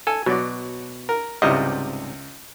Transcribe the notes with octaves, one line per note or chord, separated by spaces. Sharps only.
A4 G#5
B2 F#3 D5
A#4
C#2 G#2 C3 G3 E4 D#5